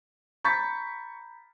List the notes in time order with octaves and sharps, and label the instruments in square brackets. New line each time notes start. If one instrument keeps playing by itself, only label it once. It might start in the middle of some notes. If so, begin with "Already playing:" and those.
[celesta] A#5 B5 G6 [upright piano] C#6 A6 B6